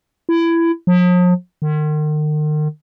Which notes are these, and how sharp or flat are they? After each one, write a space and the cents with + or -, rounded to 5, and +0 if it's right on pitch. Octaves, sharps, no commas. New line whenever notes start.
E4 +20
F3 +45
D#3 -40